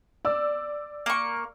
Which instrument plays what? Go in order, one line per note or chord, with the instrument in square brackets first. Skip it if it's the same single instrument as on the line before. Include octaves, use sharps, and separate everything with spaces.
[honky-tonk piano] D5 E6
[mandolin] A#3 C#6